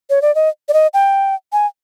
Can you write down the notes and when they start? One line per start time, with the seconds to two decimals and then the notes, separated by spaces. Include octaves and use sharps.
0.10 C#5
0.22 D5
0.35 D#5
0.69 D5
0.74 D#5
0.94 G5
1.53 G#5